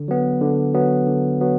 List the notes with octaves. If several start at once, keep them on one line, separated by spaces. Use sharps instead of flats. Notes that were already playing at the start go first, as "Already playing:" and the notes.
Already playing: D3
F#3 B3
D3
F#3 B3
D3
F#3 B3